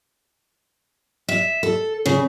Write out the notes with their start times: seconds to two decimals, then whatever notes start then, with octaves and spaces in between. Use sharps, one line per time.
1.29 E5
1.63 A4
2.06 C#3